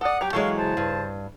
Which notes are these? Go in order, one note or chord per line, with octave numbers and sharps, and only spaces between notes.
A4 D5 F#5 D#6
F#3 G4 G5 A#5
E3 F#3 G#3 A4 C#5 F5 C#6
C#3 C5 A5
G2